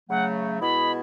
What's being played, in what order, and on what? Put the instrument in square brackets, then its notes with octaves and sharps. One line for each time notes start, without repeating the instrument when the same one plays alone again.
[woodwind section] C#3 F#3 A3 [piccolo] F#5
[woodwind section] B2 G#3 B3 E4 [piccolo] B5